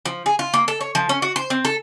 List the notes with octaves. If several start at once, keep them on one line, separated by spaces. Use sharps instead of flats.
F3
G#4
F4
A#3
A4
C#5
F3
C#4
F#4
C5
C4
A4